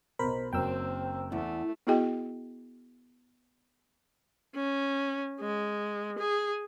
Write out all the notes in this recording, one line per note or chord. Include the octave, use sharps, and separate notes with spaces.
B1 B2 A#4 C5 B5
F#1 F#3 C4 A#4 G5 E6
E2 A3
B3 E4 F#4 G#4 D#5 G5
C#4
G#3
G#4